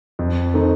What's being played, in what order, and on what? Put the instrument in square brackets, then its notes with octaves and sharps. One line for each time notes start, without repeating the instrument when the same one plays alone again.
[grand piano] F2
D#3 A3 C4 D#4